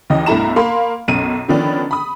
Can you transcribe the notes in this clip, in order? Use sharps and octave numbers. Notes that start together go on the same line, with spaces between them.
D#2 E3 C#4 D#5
B1 G2 A3 E4 A#5 E7
A#3 F5 B5 C6
B1 F#2 D#7
D3 D#3 F3 B3 C#4 D4
B5 D#6